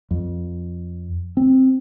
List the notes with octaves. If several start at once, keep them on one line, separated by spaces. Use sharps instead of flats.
F2
C4